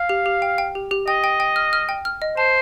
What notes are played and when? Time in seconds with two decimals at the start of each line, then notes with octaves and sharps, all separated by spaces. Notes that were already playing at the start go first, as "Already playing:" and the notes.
Already playing: F5
0.09 G4
0.26 G4
0.42 G5
0.58 G5
0.75 G4
0.91 G4
1.07 D#5 G5
1.24 G5
1.40 G5
1.56 F6
1.73 F6
1.89 G5
2.05 F6
2.22 D#5
2.37 C5 A5